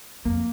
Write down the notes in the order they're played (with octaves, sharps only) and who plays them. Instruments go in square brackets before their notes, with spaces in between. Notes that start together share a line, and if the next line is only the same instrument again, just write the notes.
[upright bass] F2 [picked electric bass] A#3